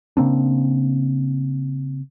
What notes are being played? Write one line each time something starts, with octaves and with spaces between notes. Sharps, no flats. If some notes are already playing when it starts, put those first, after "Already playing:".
C#3 A#3 C4 D4